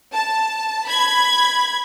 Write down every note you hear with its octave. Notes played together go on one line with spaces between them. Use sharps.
A5
B5 G#6